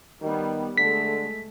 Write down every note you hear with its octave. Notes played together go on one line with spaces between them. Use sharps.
D#3 G3 B3
D3 G#3 A3 B6